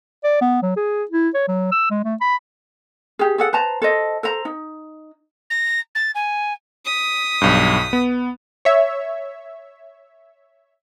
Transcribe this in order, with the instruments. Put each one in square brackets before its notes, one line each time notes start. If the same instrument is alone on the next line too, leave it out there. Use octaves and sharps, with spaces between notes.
[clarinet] D5
B3
F#3
G#4
E4
C#5
F#3
E6
G#3
A3
B5
[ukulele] G4 G#4
G#4 A4 F#5
B4 C5 A5 A#5
A4 C5 D#5
A4 C5 A#5
D#4
[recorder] A#6
A6
G#5
[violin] D#6 B6
[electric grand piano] B1 G2
B3
[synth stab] C#5 E5